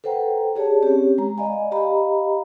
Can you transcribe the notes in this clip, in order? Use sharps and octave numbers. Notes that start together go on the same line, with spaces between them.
A4 B4 C5 F#5 G5 A#5
G4 G#4 C#5 D5 A5
C4 C#4 G4 C#5
G#3 A#5
D5 D#5 F5 G#5 B5
G4 D#5 F5 A#5 B5